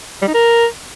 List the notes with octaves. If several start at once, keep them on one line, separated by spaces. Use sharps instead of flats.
G3
D#4
A#4